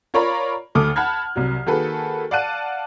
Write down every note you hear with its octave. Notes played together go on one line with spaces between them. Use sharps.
F4 A#4 C#5 D5 A#5 B5
D2 A3 A4 D6 D#6 F6
F#5 A5 B5 F6 F#6 G#6
C2 F#3
D#3 A#3 F#4 G#4 A4 B4
D5 F5 F#5 A5 F#6 D#7